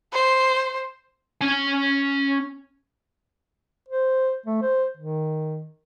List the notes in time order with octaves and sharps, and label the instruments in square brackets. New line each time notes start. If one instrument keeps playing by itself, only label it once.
[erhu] C5
[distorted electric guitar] C#4 G#5
[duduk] C5
A3
C5
D#3